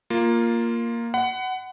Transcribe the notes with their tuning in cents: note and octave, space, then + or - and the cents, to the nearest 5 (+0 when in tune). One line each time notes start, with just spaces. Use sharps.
A#3 +0 F4 +0
F#5 +15 B5 +40